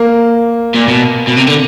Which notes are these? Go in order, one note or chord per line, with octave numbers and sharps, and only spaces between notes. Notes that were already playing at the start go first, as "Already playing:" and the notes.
Already playing: A#3
A#2
B2
B2
C3
D3